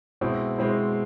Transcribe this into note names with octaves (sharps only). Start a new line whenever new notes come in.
B2 G#3 C4 E4
B2 G#3 C4 E4